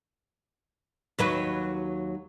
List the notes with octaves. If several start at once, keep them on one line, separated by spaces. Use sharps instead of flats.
D#2 F#3 B4